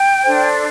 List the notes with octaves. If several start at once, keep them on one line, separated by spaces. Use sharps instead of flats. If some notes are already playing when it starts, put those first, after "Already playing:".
Already playing: G5
D4 A4 C5